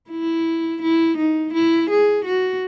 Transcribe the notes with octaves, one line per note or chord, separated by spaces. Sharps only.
E4
E4
D#4
E4
G#4
F#4